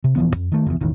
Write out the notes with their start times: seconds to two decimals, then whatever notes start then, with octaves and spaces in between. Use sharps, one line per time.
0.04 C3
0.16 D#1 E3 F3 B3
0.36 F2
0.52 D#3 A3
0.66 F1 E2
0.81 E1 A1 D#3